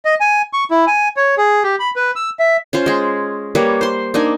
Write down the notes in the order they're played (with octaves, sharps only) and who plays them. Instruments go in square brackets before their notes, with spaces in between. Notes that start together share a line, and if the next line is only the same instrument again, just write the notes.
[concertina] D#5
G#5
C#6
E4
G#5
C#5
G#4
G4
B5
B4
E6
E5
[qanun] C#4 F4 C5
G#3 G#4
G3 A#3 B4 C#5
C5 C6
A#3 D4 D#4 G#5